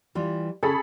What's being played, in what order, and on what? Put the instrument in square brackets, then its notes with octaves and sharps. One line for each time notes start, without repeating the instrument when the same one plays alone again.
[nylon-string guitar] E3 G3 F4
[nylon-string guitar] C#3 [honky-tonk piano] G#4 A4 B5